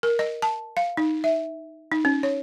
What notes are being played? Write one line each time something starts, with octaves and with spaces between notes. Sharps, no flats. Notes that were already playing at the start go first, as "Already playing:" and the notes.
A#4
D#5
A5
F5
D#4
E5
D#4
C#4
C#5